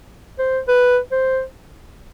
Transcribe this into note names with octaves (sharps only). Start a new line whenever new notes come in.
C5
B4
C5